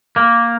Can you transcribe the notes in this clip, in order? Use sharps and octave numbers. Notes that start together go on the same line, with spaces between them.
A#3